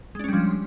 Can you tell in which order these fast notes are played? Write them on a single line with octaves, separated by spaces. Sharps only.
G#3 D4 C#4 G3 F3